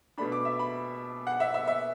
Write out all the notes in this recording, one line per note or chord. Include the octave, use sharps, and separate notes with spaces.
B2 A3 D4 B5
D6
E5
B5
F#5
E5
E5
E5